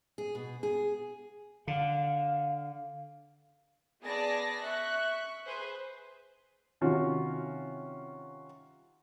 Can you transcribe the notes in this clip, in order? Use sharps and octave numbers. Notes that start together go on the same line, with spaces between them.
G#4
B2
G#4
D3 F5
B3 G#4 D5 A5 A#6
E5 C#6 F#6
G#4 B4 C5
C3 D#3 C#4 F4 F#4